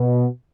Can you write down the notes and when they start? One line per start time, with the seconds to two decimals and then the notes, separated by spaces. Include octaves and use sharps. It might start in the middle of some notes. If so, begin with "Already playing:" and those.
Already playing: B2